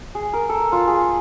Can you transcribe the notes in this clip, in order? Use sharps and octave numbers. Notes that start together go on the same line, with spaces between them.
G#4
A#4
A4
F4
G#4